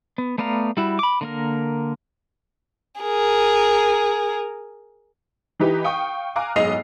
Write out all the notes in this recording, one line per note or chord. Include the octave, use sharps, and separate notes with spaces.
B3
A3 B3 D5 F5 A#5
G3 E4 F#4
B5 D6
D3 A#3 A#4
G#4 A#4
E3 D#4 G4 B4
F5 G5 C#6 D#6
F5 G#5 A#5 D6 F6 F#6
F#1 B1 G#2 D#5 C7 F7